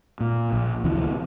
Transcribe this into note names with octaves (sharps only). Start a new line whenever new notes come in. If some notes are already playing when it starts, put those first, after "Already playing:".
A#2
A#1
D2 C3 E3